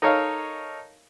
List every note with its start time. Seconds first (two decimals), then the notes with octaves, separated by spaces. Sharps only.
0.02 D#4 A4 A#4 C#5 D#5 F5